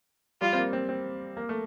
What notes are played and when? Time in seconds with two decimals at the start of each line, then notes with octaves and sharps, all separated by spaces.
0.41 G3 F4
0.53 C4
0.58 A#3
0.73 C4
0.89 C4
1.37 A#3
1.49 A3